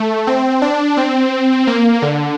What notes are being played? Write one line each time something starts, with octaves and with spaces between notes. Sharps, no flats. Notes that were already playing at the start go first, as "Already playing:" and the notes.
Already playing: A3
C4
D4
C4
A#3
D3